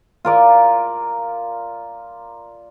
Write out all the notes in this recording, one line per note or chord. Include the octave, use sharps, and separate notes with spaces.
F4 A#4 D5